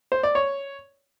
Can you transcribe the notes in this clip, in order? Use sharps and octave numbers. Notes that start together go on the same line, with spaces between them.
C5
D5
C#5